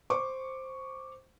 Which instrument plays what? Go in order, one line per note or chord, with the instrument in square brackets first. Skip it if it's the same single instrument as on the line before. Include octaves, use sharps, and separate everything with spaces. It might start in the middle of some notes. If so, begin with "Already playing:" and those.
[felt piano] C5 C#6 D6